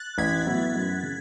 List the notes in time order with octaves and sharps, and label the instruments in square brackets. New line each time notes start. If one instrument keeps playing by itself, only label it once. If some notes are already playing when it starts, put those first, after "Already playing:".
Already playing: [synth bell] F#6 A6
[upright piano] A1 [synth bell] G#6 B6
[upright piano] A2 F#3 B3 E4
F#2
C#3